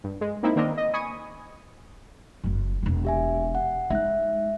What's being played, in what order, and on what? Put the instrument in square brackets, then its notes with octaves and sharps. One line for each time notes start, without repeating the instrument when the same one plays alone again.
[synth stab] G2
G#3
A#3 C4 D#4 E4
D#3 A#3 C4 D4 A#4 D#5
D#5
G#5 B5 C#6 D#6 D#7
[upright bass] F#1 F#2
E1 A#3
[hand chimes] G4 E5 G#5
F#5
[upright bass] G#3 D#4 [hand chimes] E5 F#6